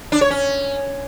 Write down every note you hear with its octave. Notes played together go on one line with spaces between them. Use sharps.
D4
C#5
C#4